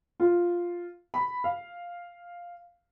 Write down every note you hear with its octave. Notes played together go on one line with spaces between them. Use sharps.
F4
B5
F5